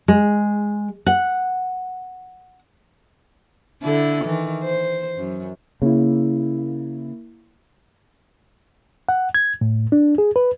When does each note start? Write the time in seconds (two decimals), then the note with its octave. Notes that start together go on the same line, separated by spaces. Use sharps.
0.08 G#3
1.06 F#5
3.83 D3 E4 A4
4.25 D#3 E3
4.64 C5
5.17 F#2
5.82 C#3 A#3 E4
9.09 F#5
9.35 G#6
9.61 A2
9.92 D4
10.18 G#4
10.36 B4